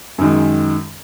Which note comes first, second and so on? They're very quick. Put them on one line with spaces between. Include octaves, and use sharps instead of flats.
F#2 D#3 G#3